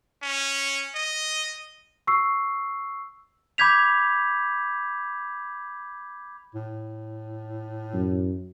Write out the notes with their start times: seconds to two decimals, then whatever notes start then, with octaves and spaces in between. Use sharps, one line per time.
0.23 C#4
0.95 D#5
2.07 C#6 E6 C7
3.58 B5 D6 G6 G#6 B6 F7
6.55 A2
7.94 F#2